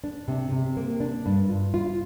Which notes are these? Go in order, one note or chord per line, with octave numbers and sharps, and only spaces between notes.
D4
C3
C3
A#3
D4
G2
F4
F4